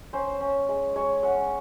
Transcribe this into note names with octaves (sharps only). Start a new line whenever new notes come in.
C#4 C5
C#4
G#3
G#3 C#5
C#4 F#5